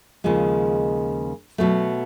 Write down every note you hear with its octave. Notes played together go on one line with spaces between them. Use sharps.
D#2 C#3 F3 G#3
B2 F#3 A3